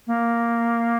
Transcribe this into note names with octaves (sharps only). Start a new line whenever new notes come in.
A#3